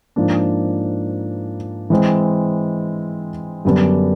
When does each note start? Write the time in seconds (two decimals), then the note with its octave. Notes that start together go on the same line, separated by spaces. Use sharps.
0.16 G#2 F3 A#3 D4
1.90 E3 G#3 C4
3.65 F#2 D3 G3 B3 D4